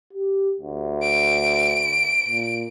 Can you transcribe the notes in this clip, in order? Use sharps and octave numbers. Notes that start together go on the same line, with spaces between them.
G4
D2
D7
A#2